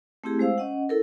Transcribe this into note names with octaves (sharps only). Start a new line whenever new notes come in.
A3 C4 E4 G4 G#4
G#3 C5 F5 E6
C#4 D#5 F#5
E4 A4 A#4